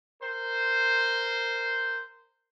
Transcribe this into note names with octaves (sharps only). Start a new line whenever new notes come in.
A#4 C5